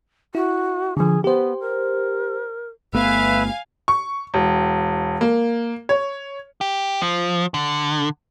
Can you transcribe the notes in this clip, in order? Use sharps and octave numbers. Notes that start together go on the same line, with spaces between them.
E4 F#4
D3 F3 G#4
B3 G4 C5
A#4
G1 A3 B3 B4 E5 F5 G#5
C#6
E1
A#3
C#5
G4
F3
D3